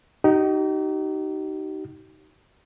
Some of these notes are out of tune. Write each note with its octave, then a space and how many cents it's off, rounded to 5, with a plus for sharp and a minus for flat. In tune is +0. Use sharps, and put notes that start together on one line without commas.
D#4 +0 G4 -45